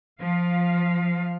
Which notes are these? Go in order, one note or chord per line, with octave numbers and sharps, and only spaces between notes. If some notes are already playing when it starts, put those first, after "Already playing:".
F3 F5